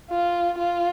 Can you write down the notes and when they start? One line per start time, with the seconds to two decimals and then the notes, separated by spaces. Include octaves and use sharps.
0.10 F4
0.58 F4